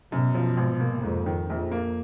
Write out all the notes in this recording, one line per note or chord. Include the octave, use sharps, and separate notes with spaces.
F#2 B2
F3
G#1
A#3
F2 G#2
D#3
A#1 F2
A#3